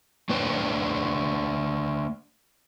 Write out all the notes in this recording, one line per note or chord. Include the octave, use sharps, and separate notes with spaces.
A3 D4 B4 C5 D#5 G5